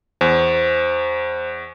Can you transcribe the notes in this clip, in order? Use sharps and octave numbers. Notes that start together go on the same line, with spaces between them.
E2 C5